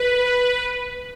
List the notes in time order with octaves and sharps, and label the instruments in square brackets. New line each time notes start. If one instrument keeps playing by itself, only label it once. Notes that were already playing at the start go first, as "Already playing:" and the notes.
Already playing: [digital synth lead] B4